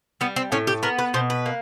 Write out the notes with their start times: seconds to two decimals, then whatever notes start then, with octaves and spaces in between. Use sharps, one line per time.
0.21 G3 B3
0.36 C4
0.52 A2 C#4
0.67 G4
0.83 B3 A#4
0.98 B4
1.14 B2 C5
1.30 B4
1.46 A#3